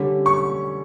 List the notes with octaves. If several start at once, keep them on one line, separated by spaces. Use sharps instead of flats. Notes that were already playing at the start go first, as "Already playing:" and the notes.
Already playing: D3 G3 C#4
C#6